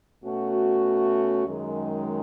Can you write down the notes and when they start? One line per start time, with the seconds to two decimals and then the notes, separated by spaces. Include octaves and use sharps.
0.24 B2 A3 C#4 F#4
1.45 F#2 D#3 G#3